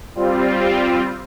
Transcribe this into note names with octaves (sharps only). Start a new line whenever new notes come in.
G3 C4 F4